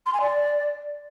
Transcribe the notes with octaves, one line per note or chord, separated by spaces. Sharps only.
C6
G#5
D5